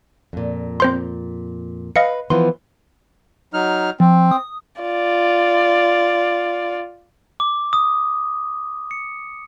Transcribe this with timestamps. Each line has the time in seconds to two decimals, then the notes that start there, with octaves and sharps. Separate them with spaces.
0.33 F2 A#2
0.80 C4 C5 C6
1.96 B4 D#5 F5 C#7
2.30 E3 F3 B3 C6
3.53 F#3 D#4 F6
4.00 F3 C4
4.31 D#6
4.82 F4 D5
7.40 D6
7.73 D#6
8.91 C#7